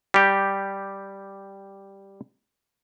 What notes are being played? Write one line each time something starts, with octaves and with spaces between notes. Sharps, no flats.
G3 G4